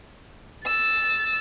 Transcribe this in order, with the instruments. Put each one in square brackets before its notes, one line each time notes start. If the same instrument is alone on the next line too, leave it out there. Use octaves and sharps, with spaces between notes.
[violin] E6 A6